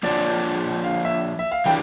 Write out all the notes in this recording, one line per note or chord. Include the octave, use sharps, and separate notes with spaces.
F3 A#3 D4 F4 C#5 D5
F5
E5
E5
F5
E3 G3 D4 G5